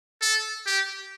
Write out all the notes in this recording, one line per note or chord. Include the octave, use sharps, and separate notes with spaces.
A4
G4